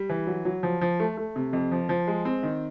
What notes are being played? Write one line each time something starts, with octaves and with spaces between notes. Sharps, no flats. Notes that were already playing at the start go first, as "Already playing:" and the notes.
Already playing: G3
E3
F#3
F#3
F3
F3
A3
A3
C3
F2
F3
F3
G#3
C4
D#3